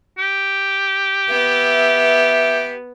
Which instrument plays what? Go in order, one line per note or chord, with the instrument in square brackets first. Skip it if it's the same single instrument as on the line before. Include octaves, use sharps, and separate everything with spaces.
[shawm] G4
[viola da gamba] B3 [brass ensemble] E5